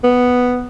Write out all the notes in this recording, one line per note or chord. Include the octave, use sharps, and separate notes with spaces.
B3